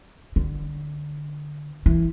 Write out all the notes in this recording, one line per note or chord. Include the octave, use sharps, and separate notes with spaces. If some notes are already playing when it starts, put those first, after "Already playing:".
D3
E3